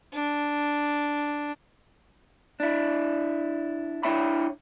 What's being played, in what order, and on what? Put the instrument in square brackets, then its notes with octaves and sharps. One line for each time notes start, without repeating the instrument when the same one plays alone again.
[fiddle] D4
[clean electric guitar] D4 E4
D4 E4 C#5 E5 G5 B5